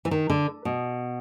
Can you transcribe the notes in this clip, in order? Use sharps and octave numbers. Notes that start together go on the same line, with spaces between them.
E3
D#3
D3
B2